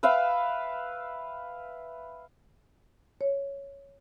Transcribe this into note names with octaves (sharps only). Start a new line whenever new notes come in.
B4 E5 F5 G5
C#5